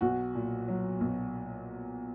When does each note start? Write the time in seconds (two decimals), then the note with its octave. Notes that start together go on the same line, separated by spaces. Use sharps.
0.01 B1 F#4
0.35 A#2
0.68 F#3
1.00 B1